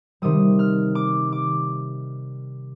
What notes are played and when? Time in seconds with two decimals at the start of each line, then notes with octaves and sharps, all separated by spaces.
0.22 C3 D#3 G3 D#6
0.59 F6
0.95 D6
1.32 D6